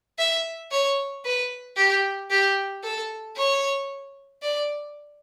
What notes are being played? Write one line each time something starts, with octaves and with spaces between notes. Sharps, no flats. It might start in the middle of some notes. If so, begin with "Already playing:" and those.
E5
C#5
B4
G4
G4
A4
C#5
D5